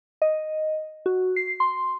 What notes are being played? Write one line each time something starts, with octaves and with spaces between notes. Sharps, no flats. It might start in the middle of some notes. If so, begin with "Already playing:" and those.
D#5
F#4
C7
C6